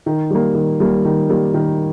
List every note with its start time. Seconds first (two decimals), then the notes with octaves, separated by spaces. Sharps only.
0.06 D#3
0.30 G3 A#3
0.55 D#3
0.80 G3 A#3
1.05 D#3
1.30 G3 A#3
1.54 D#3